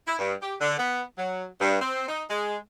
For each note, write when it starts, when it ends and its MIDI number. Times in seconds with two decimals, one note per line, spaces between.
0.07 0.16 64
0.19 0.33 43
0.42 0.56 67
0.61 0.77 50
0.78 1.02 59
1.18 1.45 54
1.61 1.79 43
1.81 2.08 60
2.08 2.23 63
2.30 2.57 56